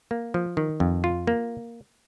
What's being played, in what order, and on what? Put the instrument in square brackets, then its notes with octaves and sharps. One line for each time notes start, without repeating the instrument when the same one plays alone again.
[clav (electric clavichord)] A#3
F3
D#3
F2
F4
A#3